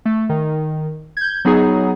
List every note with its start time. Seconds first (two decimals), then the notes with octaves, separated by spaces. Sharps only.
0.05 A3
0.29 D#3
1.17 G6 G#6
1.45 F#3 B3 D#4 G#4